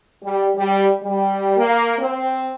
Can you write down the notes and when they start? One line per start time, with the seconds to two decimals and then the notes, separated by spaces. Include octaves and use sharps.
0.22 G3
0.55 G3
1.01 G3
1.57 A#3
1.98 C4